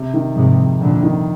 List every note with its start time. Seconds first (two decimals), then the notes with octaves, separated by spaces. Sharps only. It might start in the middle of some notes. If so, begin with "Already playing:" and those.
Already playing: C3
0.14 D#3
0.35 F2 G#2 C3
0.58 F2
0.80 F2 A#2 D3
1.03 D#3